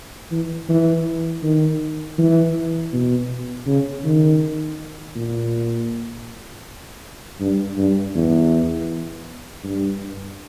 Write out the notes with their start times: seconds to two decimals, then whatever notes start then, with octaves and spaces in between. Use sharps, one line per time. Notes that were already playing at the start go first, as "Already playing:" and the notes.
0.31 E3
0.69 E3
1.43 D#3
2.18 E3
2.93 B2
3.67 C#3
4.04 D#3
5.16 A#2
7.40 G2
7.78 G2
8.15 E2
9.64 G2